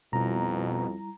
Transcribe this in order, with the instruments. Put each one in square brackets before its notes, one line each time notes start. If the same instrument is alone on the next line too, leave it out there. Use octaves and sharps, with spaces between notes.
[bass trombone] F2 [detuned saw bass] B2 [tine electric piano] G3 E4 [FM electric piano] A#5